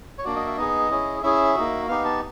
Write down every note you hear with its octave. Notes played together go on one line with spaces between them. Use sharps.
C#5
A#3 D4 F#4 D5
D#5
E5
B3 D#4 G#4 D#5
C#4 E4 G#4
C#4 E4 G#4 E5
A#3 D#4 F#4
B3 D#4 G4 F5
A5